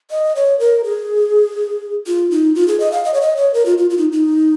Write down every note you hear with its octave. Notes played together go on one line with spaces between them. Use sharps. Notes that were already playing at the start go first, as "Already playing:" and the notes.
D#5
C#5
A#4
G#4
F4
D#4
F4
G#4
D#5
F5
D#5
C#5
D#5
C#5
A#4
F4
F4
F4
D#4
D#4